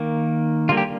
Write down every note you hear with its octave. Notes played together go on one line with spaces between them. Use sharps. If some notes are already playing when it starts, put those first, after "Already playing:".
Already playing: D#3 A#3
D3 G3 A#3 F4
G4